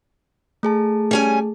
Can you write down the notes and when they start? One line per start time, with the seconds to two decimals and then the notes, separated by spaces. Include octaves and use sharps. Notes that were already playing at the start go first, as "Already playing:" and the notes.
0.63 A3 G#4 A5
1.11 G3 C#4 G#5